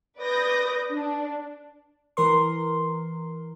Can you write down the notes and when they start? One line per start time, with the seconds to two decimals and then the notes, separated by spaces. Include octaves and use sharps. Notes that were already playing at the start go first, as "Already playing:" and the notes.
0.20 B4 D5 D#6 G6 A#6
0.91 D4
2.17 E3 A#4 C6